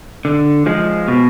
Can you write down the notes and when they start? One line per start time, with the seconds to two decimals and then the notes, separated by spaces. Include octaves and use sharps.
0.25 D3
0.66 F3 G#3
1.08 B2